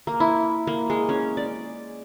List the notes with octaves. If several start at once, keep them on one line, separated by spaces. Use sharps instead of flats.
A#3
E4
A#3
G#3
C#4
D5